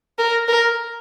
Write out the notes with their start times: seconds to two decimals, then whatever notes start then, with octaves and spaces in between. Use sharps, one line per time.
0.19 A#4
0.48 A#4